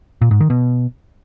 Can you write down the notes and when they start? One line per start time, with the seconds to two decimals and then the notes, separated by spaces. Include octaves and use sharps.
0.21 A#2
0.31 G#2
0.40 D#3
0.50 B2